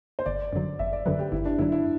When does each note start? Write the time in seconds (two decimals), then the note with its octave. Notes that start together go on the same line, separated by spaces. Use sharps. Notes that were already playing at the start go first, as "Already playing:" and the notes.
0.19 C5
0.26 G1 D5
0.53 F#2 D3 F#3
0.79 G1 E5
0.93 D5
1.06 F#2 D3 F#3 B4
1.19 G4
1.32 G1 E4
1.45 D4
1.59 F#2 D3 F#3 E4
1.72 E4